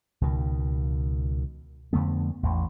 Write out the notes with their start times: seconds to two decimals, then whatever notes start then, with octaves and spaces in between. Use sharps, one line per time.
0.21 C#2 B2 D#3
1.93 F2 D3 A3 B3
2.43 A1 E2